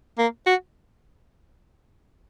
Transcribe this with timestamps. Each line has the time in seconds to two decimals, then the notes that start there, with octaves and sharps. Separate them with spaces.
0.18 A#3
0.46 F#4